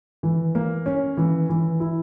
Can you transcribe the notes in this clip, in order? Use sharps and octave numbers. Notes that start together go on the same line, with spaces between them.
E3
A#3
C#4
E3
E3
E4